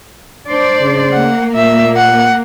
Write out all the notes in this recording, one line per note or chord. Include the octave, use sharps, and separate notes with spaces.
D4 C5 D5
C#3
A#3 F#5
A#2 E5
F#5